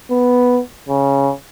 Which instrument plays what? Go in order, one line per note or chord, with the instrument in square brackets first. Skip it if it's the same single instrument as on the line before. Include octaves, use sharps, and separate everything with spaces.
[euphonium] B3
C#3